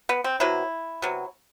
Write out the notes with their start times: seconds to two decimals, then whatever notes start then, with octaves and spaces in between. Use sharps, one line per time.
0.09 B3
0.24 C4
0.40 C3 F#3 B3 E4
1.02 C3 F#3 B3